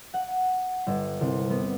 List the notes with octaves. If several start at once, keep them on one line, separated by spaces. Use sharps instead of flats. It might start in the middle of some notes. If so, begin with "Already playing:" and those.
F#5
G1
C2
B3